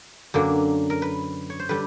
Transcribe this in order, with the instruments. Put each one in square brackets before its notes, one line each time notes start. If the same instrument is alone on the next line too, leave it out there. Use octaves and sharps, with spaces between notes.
[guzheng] F#2 D3 F#3 A#3
A#4
B4
C#5
C5
D3 G3 B4